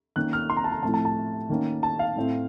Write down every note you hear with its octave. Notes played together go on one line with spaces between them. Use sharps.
D#3 A#3 C#4 F#6
F6
C6
A#5
A5
A#5
A2 F3 A3 C4 A5
A5
A5
D#3 A#3 C#4
A5
F5
A2 A3 C4